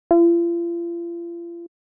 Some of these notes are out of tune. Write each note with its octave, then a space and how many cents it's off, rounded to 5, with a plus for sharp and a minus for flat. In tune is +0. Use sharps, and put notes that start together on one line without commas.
F4 -40